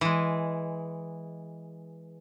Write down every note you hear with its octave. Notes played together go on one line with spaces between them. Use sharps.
E3 G#3